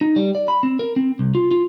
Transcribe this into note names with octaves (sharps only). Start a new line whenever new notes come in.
D#4
G3
D5
B5
C4
A#4
C4
C2
F4
F4